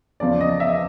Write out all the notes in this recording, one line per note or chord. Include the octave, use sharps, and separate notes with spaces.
E2 C#3 F3 D5
D#5
E5